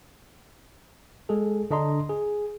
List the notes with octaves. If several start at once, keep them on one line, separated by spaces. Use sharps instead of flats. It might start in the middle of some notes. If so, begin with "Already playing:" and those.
G#3 G#4 A4
D3 D4 D#5 A#5 C6
G#4